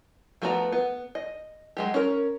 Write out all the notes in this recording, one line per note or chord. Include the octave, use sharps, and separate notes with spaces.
F3 A3 B3 F#4 A#5
B3
D#5
F#3 G#3 G4
C#4 A#4